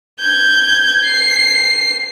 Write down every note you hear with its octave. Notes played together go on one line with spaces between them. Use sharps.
G6 G#6
C7